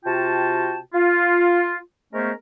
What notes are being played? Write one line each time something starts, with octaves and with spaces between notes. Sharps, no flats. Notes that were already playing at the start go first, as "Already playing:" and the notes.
C3 F4 F#4 G5 A5
F4
G#3 A3 B3 C#4 A#4 C5